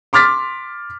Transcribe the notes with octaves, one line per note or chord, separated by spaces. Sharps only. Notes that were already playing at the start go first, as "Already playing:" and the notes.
C6 D6 F6 A6 B6